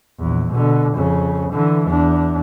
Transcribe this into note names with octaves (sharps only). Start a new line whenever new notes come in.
A#1 E2
B2 D3
F2 C#3
D3 E3
E2 D4